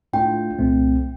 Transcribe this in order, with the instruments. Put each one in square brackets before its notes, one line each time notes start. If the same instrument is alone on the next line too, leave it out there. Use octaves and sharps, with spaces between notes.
[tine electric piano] A2 A3 D4 F4 [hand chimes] G5
[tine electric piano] C2 A#2 A3 C4